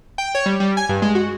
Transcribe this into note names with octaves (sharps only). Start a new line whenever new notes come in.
G5
C#5
G3
G3
G#5
G2
G#3
F#4